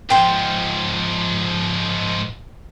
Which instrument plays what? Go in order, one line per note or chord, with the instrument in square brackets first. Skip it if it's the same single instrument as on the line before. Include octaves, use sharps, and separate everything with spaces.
[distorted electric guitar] G#2 F3 [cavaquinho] G5 C6